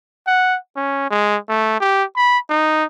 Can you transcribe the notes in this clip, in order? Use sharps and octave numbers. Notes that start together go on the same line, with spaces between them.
F#5
C#4
G#3
A3
G4
B5
D#4